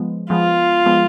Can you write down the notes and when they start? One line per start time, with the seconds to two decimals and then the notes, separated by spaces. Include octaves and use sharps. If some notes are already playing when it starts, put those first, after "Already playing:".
Already playing: F3 G#3 B3
0.30 F3 G#3 B3 F4
0.86 F3 G#3 B3